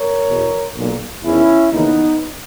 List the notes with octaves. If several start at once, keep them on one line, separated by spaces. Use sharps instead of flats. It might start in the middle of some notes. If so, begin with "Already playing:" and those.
Already playing: A#4 C#5
E2 B2
B1 A#2
E2 D#3 C#4 E4
D#2 C#3 E3 B3 D#4